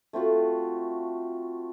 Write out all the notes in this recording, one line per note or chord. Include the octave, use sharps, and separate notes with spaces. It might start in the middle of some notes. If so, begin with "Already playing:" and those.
A3 C4 F4 F#4